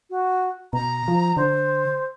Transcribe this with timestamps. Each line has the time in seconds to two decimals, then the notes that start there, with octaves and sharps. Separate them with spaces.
0.10 F#4
0.73 B2 A#5
1.08 F3
1.37 D3 C5